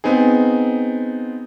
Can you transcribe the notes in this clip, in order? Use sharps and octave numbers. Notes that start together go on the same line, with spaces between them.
B3 C4 D#4 G#4